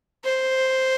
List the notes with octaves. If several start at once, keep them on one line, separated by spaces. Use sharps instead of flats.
C5